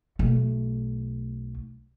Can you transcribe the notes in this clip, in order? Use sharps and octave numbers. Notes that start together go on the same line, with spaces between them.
B1 A3